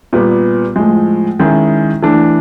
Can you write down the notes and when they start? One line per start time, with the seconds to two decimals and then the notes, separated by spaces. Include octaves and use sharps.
0.13 A#2 G3 B3
0.76 A2 F3 G#3
1.39 D#3 G#3 C#4 E4
2.03 E3 A3 D4